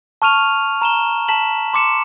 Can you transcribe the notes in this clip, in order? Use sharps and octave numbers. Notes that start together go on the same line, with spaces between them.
A5 C#6 F6 D#7 F7
A#5 E7 G7
A5 B6 E7 F#7
C6 D6 C#7 E7